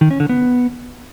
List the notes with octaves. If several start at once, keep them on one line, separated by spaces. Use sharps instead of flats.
D#3
C#4
D3
B3